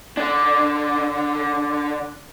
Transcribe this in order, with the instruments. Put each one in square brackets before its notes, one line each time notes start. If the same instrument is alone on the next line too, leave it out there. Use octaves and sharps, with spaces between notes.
[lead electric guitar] D3 D4